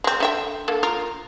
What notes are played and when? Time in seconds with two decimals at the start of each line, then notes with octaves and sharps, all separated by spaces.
0.04 G#3 C4
0.20 D3 E5 G5
0.68 D3 A#3 A4
0.83 F4 A#4